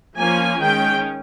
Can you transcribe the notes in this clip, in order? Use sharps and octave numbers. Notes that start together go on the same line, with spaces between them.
F3 A#3 C#4 G#5
D#3 G#3 C#4 G5